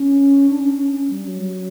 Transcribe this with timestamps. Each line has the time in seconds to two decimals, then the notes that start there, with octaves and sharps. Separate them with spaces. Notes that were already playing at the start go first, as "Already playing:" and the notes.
Already playing: C#4
0.49 D4
0.60 C#4
0.77 C#4
0.93 C#4
1.10 G3
1.27 F#3